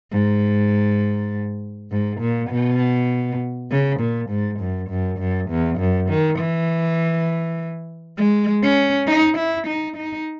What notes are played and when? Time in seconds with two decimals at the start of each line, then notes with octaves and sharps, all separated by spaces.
0.12 G#2
1.91 G#2
2.21 A#2
2.50 B2
3.71 C#3
4.00 A#2
4.30 G#2
4.60 F#2
4.90 F#2
5.19 F#2
5.50 E2
5.79 F#2
6.09 D#3
6.39 E3
8.18 G#3
8.63 C#4
9.07 D#4
9.37 E4
9.67 D#4
9.97 D#4